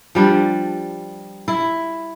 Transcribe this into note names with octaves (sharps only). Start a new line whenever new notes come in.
F3 G3 D4
E4